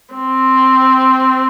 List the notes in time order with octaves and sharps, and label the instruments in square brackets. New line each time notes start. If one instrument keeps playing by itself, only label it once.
[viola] C4